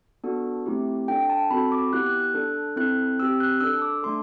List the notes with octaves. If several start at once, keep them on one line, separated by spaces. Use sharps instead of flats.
B3 D4 F#4 A4
A3 C4 E4 G4
D4 A4 G5
A5
C4 F#4 A4 B5
D6
B3 E4 G4 F#6
F#6
F#6
D4 A4
C4 E4 A4 F#6
C4 G4 E6
F#6
D4 A4 E6
D6
A3 D4 A4 C6